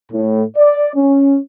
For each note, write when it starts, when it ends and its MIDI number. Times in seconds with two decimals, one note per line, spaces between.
0.12 0.43 45
0.57 0.89 74
0.95 1.37 61